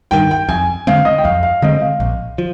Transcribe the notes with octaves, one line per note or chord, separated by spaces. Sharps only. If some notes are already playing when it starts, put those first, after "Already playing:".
G2 D#3 G5
G5
F2 G#5
D3 G#3 C4 F5
D#5
G5
F2 F5
F5
D3 G#3 C4 D#5
F5
A#1
F3